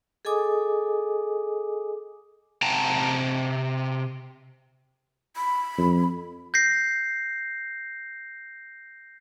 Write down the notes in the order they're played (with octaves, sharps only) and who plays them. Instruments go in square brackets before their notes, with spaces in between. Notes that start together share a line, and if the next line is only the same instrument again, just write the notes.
[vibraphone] G#4 A4 D#5 G#5 D6 D#6
[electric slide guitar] C3 G5 A5 A#5
[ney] B5
[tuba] F2
[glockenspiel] G6 A#6 C7